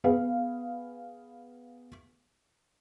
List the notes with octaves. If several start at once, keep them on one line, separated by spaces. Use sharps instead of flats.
B3 G#4 B4 F5